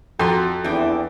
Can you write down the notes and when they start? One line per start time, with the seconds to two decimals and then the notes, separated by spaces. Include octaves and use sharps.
0.19 F2 C4 F4 F#4 A#5 C6
0.64 E2 C4 D4 E4 G5